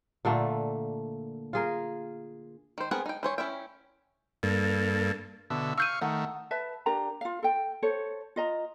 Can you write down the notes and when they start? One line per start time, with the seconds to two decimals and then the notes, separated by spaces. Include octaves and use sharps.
0.25 A#2 D3 A3 A#3
1.53 F4 G#4 A#4
2.78 D#3 C5
2.91 B3 C4 G#4 A#4 F#5
3.06 D#4 G5
3.23 E3 C5 C#5
3.38 C#4 E4 E5 G5
4.43 G2 A#3 A4
5.50 B2 D3 E5
5.78 F5 C#6 E6 G6 D#7
6.01 D#3 A3 F#5
6.51 B4 E5 A5
6.86 D4 G4 A#4 A#5
7.21 F4 F5
7.43 A4 G5
7.83 A4 C5 C#5
8.36 F4 D#5 A#5